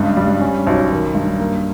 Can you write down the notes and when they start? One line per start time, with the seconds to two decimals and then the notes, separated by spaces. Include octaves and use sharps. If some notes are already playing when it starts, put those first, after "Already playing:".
Already playing: C#2 G2
0.17 G3
0.41 C#4
0.67 B1
0.91 D#3
1.15 G2
1.39 A#3